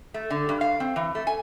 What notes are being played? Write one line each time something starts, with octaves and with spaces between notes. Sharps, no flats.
A3
D3
G2
F5
C4
E3
A3
G#5